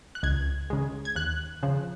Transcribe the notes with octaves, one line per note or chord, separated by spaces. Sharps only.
F#6
C#2 G#6
C#3 G#3
G#6
D#2 F#6
C#3 F3